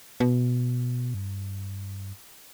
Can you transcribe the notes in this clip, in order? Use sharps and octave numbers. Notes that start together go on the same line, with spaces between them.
B2
G2